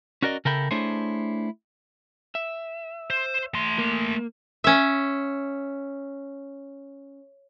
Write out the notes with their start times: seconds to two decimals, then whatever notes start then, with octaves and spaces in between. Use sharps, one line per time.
0.22 C#4 F#4 A#4 D5 D#5
0.45 C#3 A4 A#4 E5 G5 B5
0.71 A3 D4 E4 G#4 C5 C#5
2.35 E5
3.10 C5
3.54 A3 C6
3.79 A#3
4.64 C#4 E5